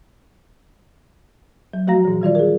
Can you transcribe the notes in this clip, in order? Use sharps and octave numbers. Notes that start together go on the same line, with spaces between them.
F#3
F3 A3 F#4 F5 A#5 A#6
A#2 E3
D#3 G3 F4 D5
G#4 A#4